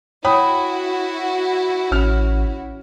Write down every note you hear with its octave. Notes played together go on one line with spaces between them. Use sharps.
E4 F#4 C#5 G5 B5 D#6
A1 C#4 F6